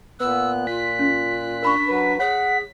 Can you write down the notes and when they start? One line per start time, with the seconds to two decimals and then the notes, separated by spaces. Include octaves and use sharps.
0.20 A#2 B3 E6 F#6
0.67 F4 B6
0.99 C#4
1.63 D4 A#4 B5 C#6
1.88 F#3 B4
2.20 G#4 C#5 F#5 B6